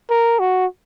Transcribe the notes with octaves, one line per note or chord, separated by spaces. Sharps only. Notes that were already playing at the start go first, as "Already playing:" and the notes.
A#4
F#4